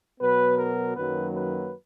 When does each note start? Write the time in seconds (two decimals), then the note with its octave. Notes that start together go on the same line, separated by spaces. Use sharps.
0.20 B2 F#3 B3 B4
0.57 A#4
0.96 F#2 D#3 F#3 A#3 B4
1.33 B4